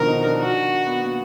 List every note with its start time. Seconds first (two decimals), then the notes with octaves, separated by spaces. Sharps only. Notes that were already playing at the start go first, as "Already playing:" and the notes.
Already playing: B2 D3 D#3 F3 A#4
0.08 D#4
0.24 D4
0.40 F#4
0.86 B3
1.02 A#3